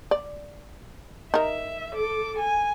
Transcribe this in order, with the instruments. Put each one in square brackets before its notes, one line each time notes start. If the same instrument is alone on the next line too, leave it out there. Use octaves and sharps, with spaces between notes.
[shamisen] D5
[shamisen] D#4 A#4 [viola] E5
[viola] A4 D6
G#5